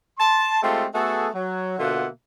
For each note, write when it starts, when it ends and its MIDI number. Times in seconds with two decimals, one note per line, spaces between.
0.19 0.60 81
0.19 0.60 84
0.62 0.86 56
0.62 0.86 57
0.62 0.86 60
0.62 0.86 65
0.62 0.86 67
0.62 0.86 69
0.93 1.27 57
0.93 1.27 59
0.93 1.27 66
0.93 1.27 68
0.93 1.27 69
1.34 1.75 54
1.78 2.07 47
1.78 2.07 50
1.78 2.07 58
1.78 2.07 65
1.78 2.07 76
1.78 2.07 78